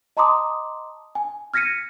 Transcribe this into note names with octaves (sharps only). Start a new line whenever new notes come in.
D#5 A5 A#5 C6 D6 D#6
G#5
F6 G#6 A#6 B6 C#7 D#7